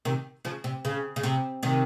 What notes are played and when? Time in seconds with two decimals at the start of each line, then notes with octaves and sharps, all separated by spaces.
0.05 C3 D#3
0.45 C#3 F3
0.64 C3
0.85 C#3
1.16 C#3
1.23 C3
1.63 C3 D#3